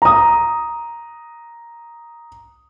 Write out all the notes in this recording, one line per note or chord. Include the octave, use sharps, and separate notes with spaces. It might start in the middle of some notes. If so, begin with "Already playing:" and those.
A#5 D#6